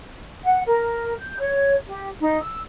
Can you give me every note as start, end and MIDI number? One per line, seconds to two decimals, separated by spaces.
0.44 0.60 78
0.66 1.14 70
1.18 1.38 91
1.39 1.74 73
1.87 2.07 67
2.20 2.39 63
2.41 2.59 88